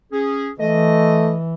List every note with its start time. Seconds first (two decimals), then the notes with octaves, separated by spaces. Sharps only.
0.12 C#4 G#4
0.60 E3 A3 D#5